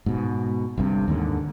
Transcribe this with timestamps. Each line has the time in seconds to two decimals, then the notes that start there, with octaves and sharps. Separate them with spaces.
0.06 G#2 B2
0.78 G1 G2 C3
1.08 D#2 G#2 D3